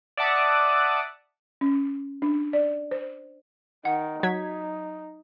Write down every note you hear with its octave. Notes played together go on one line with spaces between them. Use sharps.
D5 E5 F#5 A5 D6 D#6
C#4
D4
D5
C5
D#3 F#5
F#3 D#4 G#6 B6